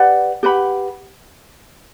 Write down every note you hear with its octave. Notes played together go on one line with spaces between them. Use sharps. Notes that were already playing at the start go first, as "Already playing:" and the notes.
Already playing: G4 B4 D5 F#5
G4 B4 F#5 B5